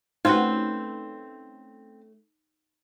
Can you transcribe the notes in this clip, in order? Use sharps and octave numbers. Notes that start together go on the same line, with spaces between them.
A3 C4 C#4 D#4 F4 F#4 B4